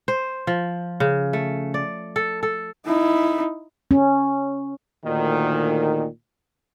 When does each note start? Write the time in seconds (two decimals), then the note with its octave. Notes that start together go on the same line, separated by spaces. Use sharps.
0.08 C5
0.47 F3
1.00 C#3
1.33 A3
1.74 D5
2.16 A4
2.43 A4
2.86 D#4 E4
3.91 C#4
5.05 D2 A#2 D#3